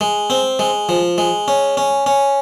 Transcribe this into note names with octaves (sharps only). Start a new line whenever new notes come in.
G#3
C4
G#3
F3
G#3
C#4
C#4
C#4